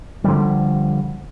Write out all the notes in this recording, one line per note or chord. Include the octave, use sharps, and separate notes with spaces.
D3 F3 G3